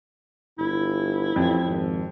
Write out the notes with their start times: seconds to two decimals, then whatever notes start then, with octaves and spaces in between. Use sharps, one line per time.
0.58 G1 E4
1.36 A1 F2
1.65 G#1